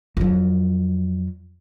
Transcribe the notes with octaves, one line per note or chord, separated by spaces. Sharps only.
F2 F#3